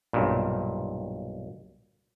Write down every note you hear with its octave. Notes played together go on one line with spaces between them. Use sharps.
B1 G2 A#2